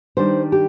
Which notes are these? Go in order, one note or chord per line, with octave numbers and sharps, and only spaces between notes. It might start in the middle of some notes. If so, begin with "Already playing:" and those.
D#3 G3 D4 C5
G4